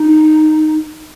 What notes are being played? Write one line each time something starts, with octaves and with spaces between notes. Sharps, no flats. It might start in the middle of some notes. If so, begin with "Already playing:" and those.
Already playing: D#4